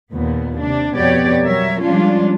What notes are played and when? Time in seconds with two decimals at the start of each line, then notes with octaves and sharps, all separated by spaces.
0.11 D#2 A#2 B3
0.59 C3 D4
0.96 F2 B2 B3 G4 C#5 D5
1.42 F#3 G3 A#4 C#5 E5
1.83 F3 G3 G#3 C#4 D4 F4